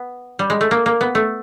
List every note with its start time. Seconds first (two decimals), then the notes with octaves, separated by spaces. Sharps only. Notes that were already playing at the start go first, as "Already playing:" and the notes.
Already playing: B3
0.39 G3
0.50 G#3
0.61 A3
0.71 A#3
0.86 A#3
1.01 B3
1.15 A3